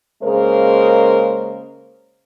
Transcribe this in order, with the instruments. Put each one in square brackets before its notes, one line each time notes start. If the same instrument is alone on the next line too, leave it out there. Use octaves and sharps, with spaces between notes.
[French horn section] C#3 G#3 A#3 G#4 A#4 C5